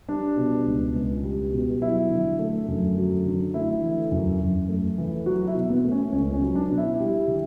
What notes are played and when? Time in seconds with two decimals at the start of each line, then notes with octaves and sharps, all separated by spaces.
0.09 G3 D4
0.37 B2
0.66 C#2
0.96 C#2
1.23 G3
1.52 B2
1.82 F#3 E4
2.10 D3
2.39 A3
2.68 F#2
2.97 F#3
3.25 D3
3.54 A3 E4
3.83 E3
4.12 F#2
4.40 F#2
4.69 A3
4.98 E3
5.26 F#3 F#4
5.48 E4
5.55 B2
5.70 B3
5.84 A3
5.91 C#4
6.12 C#2 C#4
6.34 C#4
6.41 F#3
6.55 D4
6.70 B2
6.78 E4
6.99 G3
7.27 D3